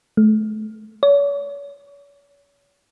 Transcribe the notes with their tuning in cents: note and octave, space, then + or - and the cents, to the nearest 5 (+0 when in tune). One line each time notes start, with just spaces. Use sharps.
A3 -35
C#5 +40